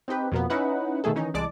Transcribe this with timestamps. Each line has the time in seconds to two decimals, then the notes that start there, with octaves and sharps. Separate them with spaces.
0.08 C4 D#4 G4 B4
0.32 F2 B2 A#3 B3
0.50 C#4 D#4 E4 B4 F#5
1.04 B2 D#3 A3 G#4 A4
1.15 D#3 E3 C#4 D#4
1.34 C2 E3 G#3 D5 A5 D6